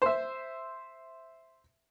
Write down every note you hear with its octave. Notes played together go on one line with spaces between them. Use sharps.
C5 E5